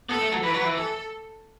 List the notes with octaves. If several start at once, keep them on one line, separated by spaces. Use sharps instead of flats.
B3 A4
A3
F#3
E3 B4
F#3
E3
A4